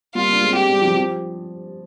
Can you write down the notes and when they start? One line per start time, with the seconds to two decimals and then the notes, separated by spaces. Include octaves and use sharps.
0.15 G3 A#3 F4
0.28 A#3 D4
0.42 G#3 C4
0.55 G4
0.69 G3
0.81 F3
0.96 F3